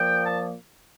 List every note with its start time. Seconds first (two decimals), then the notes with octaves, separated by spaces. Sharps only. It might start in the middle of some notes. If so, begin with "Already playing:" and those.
Already playing: A#2 F3 A#3 G5
0.26 A5